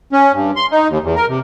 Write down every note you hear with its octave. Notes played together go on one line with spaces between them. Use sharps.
C#4
G2
C6
D#4
D#2
E2
A#4
C3